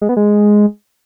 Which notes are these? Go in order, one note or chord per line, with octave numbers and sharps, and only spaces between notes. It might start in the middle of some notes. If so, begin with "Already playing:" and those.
G#3
B3
G#3